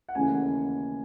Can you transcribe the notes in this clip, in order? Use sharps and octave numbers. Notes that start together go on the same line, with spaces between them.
F#5
D#2 C#3 E3 A3 C#4 G#5